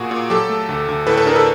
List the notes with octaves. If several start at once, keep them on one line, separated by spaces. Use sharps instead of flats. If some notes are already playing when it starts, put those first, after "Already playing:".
Already playing: A#2 F#4 G#4
A#2
F#3 G4 A4
A3
D2
D2
A2 A4 B4
A4 B4
D4 G#4 A#4
A4 B4